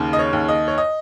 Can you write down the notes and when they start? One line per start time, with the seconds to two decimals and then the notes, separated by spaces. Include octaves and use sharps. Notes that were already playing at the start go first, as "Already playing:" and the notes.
Already playing: D#2 C#3
0.13 D#5
0.19 C#5
0.33 D#2
0.49 D#5
0.68 C#5
0.78 D#5